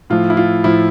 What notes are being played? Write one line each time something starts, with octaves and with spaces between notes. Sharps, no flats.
A2 F3 F4
E4
F4
A2 F3 E4